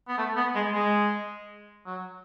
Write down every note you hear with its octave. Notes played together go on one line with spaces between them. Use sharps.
B3
A3
B3
G#3
G#3
F#3